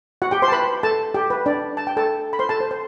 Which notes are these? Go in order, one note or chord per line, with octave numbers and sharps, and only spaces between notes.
F#4 F#5
G4 G5
C5 C6
A5
B4 B5
A4 A5
G4 G5
B4
D4 D5
A5
G5
A4 A5
B5
C5 C6
A4 A5
C5
C5